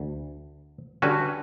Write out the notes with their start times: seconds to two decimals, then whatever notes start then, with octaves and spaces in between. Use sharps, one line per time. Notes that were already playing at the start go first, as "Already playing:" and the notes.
Already playing: D2
1.02 D3 G3 C#4 F#4 B4